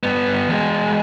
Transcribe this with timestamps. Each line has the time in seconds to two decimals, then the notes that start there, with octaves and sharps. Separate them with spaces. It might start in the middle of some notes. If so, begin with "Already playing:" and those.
0.03 G2 B3
0.49 E2 G#3